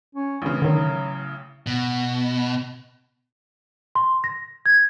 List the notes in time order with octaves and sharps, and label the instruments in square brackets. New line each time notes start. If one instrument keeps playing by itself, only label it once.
[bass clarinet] C#4
[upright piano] A1 C#3 [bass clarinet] E3
[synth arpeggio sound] D3 D#3 [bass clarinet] F#3
[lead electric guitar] B2
[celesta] C6
A#6
G#6